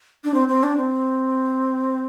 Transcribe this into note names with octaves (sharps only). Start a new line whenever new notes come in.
D4
C4
C4
D4
C4